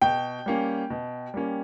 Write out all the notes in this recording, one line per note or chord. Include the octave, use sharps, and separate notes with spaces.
B2 G5
G3 A#3 C#4
B2
G3 A#3 C#4